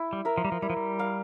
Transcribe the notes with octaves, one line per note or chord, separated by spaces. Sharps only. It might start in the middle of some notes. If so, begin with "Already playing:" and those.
Already playing: E4
G3
A#4 E5
F3
G3
F3
G3 E4
F3
G3
A#4 F5